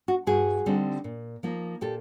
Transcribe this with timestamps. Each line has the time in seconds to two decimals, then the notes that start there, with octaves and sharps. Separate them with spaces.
0.08 F#4
0.27 G2 F#4 G#4
0.66 D3 G3 C4 D#4
1.04 A#2
1.43 F3 A#3 D#4
1.81 A#2 G4 A4